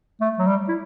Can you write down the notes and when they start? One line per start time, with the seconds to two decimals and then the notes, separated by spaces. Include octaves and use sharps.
0.21 A3
0.39 F#3
0.47 G3
0.69 E4